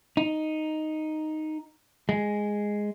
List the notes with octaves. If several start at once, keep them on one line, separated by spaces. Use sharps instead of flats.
D#4
G#3